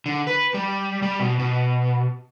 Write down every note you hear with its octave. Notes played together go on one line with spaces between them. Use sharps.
D3
B4
G3
G3
B2
B2